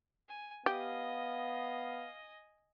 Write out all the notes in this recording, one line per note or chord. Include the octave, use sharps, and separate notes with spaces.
G#5
B3 G4 D#5 F5 G#5